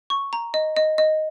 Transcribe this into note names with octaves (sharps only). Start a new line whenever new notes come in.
C#6
A#5
D#5
D#5
D#5